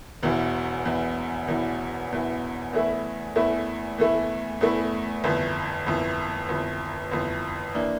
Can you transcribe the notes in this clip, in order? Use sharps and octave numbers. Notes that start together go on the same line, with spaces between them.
E1 E2 E3
E1 E2 E3
E1 E2 E3
E1 E2 E3
E2 E3 A3 E4
E2 E3 A3 E4
E2 E3 A3 E4
E2 E3 A3 E4
G1 F2 E3
G1 F2 E3
G1 F2 E3
G1 F2 E3
E3 A#3 D4